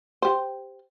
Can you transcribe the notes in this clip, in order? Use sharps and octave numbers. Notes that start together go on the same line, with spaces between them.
G4 C5